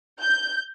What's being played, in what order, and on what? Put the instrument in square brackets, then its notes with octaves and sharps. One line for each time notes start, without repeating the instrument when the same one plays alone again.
[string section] G6